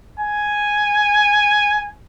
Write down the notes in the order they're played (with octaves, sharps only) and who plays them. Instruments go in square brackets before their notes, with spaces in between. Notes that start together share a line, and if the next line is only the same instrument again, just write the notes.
[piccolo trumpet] G#5